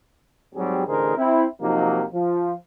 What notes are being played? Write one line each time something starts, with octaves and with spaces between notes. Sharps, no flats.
G#2 F#3 G3 C4 G4 G#4
A1 D3 D#4 G#4 A#4 C5
C4 E4
C3 F3 F#3 A#3 D#4
F3